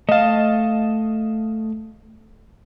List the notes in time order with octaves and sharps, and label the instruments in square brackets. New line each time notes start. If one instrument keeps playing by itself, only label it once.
[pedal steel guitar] A3 A5 [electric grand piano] D#5 F5